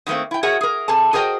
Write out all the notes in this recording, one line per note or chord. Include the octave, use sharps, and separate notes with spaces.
D#3 F#3 A3 A#3 C4
E4 G5
F#4 G#4 A#4 C#5 E5 F#5
G#4 A#4
C3 G#4 A4 A5
F#4 G#4 A#4 C5 D#5 G5